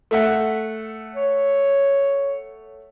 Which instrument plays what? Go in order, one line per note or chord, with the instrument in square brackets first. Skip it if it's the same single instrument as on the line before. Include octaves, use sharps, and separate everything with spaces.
[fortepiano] A3 E5 F#5
[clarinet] C#5